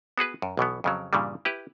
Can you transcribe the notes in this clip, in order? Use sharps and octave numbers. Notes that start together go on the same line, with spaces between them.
B3 F#4 G#4 B4
F#2
B1 B2 E3 B3
F2 C#3 F#3
G2 A#2 C#3 E3 G3
E4 G4 B4